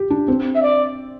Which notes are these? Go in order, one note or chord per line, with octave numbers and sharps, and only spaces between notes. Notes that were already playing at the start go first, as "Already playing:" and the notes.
Already playing: G4
D4
C4
E5
D5